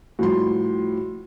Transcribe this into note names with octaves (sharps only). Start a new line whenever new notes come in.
A2 F3 G3 F#4 C6